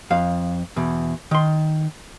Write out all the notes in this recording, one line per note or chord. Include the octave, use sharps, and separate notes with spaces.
F2 F5
E2 B2
D#3 C6